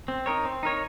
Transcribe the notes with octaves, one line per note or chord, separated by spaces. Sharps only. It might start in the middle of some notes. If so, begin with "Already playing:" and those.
C4
D#4 A#4 C#5
C4
D#4 A#4 C#5